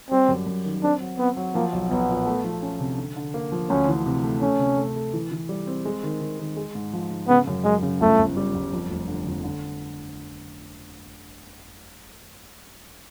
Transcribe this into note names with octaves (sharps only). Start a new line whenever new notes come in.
G3 C4
F#2
F#2
D#3
C4 D4
F#3
B3 C4
F#3
F3 A#3
B1
B1 B3
A#2
A3
F3
C#4
C3
D3
D3
A#3
F3
D2 C#4
E3
C3
A3
A3 C#4
C3
A3
A3
E3
E3
G3
C4
G#3
D#3
D#3
D#3
G#3
G#2
F3
G#2
C#3 B3
F#2
F#2 G#3
C#3
G1 A3
G1
G3
G1
F2
F1
D3
F2
D3